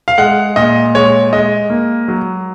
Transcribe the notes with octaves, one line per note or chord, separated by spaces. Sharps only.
F5
G#3 F#5
A#2 D#5
G#3 C#5
G#3 D#5
A#3
F#3